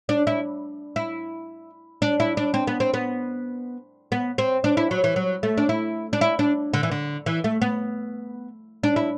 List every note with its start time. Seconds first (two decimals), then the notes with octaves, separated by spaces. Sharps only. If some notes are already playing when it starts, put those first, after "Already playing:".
0.09 D4
0.27 E4
0.96 E4
2.02 D4
2.20 E4
2.37 D4
2.54 C4
2.67 B3
2.80 C4
2.94 B3
4.12 B3
4.38 C4
4.64 D4
4.77 E4
4.91 F#3
5.04 E3
5.16 F#3
5.43 A3
5.58 D4
5.69 E4
6.13 D4
6.21 E4
6.39 D4
6.73 D3
6.83 E3
6.91 D3
7.26 E3
7.44 A3
7.61 B3
8.83 D4
8.96 E4